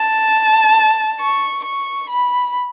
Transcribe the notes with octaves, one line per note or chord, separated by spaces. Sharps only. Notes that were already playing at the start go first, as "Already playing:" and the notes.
Already playing: A5
C#6
C#6
B5